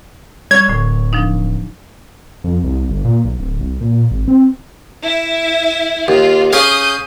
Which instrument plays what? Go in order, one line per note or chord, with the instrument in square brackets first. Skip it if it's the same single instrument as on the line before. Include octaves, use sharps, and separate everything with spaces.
[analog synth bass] G3 [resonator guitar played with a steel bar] C#5 [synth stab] G#6
[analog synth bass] D1 [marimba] A2 D3
[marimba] F3 D4 D#4
[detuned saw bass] F2
C2
G1
A#2
B1
D1
C2
A#2
G#1
C4
[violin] E4 E5
[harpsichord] D#2 [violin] F4
[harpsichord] C#4 G#4 F5 [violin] D#6 G6